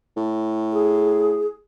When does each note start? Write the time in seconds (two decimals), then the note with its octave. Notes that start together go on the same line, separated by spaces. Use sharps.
0.17 A2
0.73 G#4